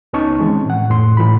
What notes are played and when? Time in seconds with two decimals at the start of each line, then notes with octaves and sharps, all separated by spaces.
0.13 C#2 B3 C#4 D#4 A5 C#6
0.38 D#3 E3 G#3 C4 C#4
0.65 A2 E3 F#5
0.90 F2 A2 C6
1.17 A2 E3 F4 B5